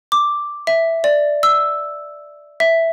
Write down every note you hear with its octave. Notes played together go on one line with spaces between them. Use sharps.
D6
E5
D5
E6
E5